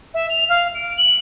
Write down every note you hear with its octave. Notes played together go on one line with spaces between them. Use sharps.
E5
F7
F5
D7
F#7